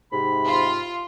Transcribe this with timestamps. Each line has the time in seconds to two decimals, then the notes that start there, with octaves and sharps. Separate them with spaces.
0.12 G#2 C3 B5
0.46 F4